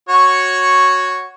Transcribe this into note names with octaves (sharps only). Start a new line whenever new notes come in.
F#4 C#5 C#6